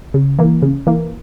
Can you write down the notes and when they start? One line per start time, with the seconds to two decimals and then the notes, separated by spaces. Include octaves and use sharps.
0.14 C#3
0.39 E3 A#3
0.62 C#3
0.87 E3 A#3